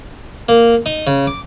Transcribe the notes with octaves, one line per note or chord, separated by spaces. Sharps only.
A#3
D#4
C#3
D6